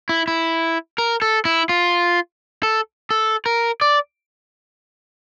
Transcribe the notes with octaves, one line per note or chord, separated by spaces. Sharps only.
E4
E4
A#4
A4
E4
F4
A4
A4
A#4
D5